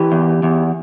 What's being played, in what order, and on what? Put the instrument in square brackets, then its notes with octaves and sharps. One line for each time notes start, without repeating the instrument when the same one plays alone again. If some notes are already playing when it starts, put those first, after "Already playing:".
Already playing: [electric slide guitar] E3 G4
E2
E2